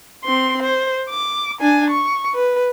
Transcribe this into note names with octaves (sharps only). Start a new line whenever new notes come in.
C4 C6
C5
D6
D4 G#5
C#6
B4